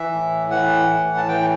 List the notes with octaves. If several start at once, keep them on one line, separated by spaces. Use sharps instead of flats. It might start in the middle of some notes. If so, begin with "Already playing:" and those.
Already playing: E3 E5
A2
E3 F#5
A2
A5
E3 G5